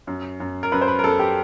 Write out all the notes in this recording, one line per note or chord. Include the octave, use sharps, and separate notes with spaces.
F#2
F#2
A#4
F#2 B4
C5
B4
A#4
F#2 A4
G4